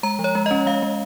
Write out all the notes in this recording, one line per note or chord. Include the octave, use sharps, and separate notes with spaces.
G#3 A#5
F3
C#5
G#3
C#4 D#5
G#3 F5
G#3